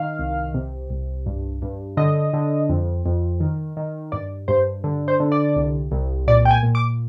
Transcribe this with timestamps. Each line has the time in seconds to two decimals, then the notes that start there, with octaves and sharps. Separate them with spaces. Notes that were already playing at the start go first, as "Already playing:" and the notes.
Already playing: D#3 F5
0.19 C2
0.54 C3
0.90 C2
1.26 G2
1.62 G2
1.97 D3 D#5
2.33 D3
2.69 F2
3.06 F2
3.40 D#3
3.77 D#3
4.12 G2 D5
4.48 G2 C5
4.84 D3
5.08 C5
5.20 D3
5.32 D5
5.56 C2
5.91 C2
6.27 A#2 D5
6.45 G5
6.51 G#5
6.63 A#2
6.75 D6